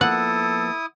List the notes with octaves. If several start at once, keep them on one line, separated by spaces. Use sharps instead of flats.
F3 A#3 B3 E4 A4 F#5 D#6